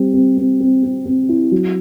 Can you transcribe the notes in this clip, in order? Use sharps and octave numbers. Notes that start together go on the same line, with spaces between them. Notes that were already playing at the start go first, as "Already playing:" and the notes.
Already playing: G3 C4
C4
C4
C4
C4
C4
E4
F#3